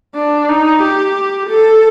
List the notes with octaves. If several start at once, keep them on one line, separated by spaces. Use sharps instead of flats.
D4
D#4
G4
A4